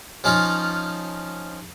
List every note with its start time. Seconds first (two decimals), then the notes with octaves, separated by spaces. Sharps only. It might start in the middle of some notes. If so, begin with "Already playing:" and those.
0.24 F3 C#4 D#4 F4